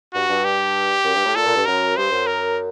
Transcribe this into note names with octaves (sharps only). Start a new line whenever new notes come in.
G2 F#4
G2
G4
F#2
G2
A2
A#2 A4
A#2
G2
F#2 A#4
G2 C5
F#2
A#4